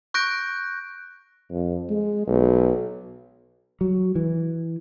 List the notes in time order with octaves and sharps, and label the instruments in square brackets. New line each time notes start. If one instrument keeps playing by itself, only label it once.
[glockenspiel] C#6 F#6 G6 A#6 D7
[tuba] F2
G#3
B1
[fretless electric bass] F#3
E3